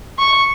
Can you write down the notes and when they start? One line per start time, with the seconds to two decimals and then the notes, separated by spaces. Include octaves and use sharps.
0.19 C#6